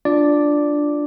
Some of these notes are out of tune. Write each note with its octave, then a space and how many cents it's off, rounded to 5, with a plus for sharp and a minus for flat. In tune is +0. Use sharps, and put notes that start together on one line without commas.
D4 +0 F4 +0 D5 +0